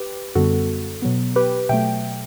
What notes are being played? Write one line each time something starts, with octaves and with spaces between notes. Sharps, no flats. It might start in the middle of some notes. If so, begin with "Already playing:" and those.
Already playing: G4 B4
F#2 D3 G3 B3 F#4 A4
B2 F#3 B3
G4 B4
B2 F#3 A3 E5 G5